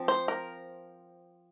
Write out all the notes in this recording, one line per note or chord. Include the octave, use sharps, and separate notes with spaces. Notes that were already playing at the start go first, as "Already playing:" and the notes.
Already playing: F3 C4
C5
A#4